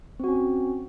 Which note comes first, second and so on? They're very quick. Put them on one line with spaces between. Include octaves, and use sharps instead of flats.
C4 F#4 C#4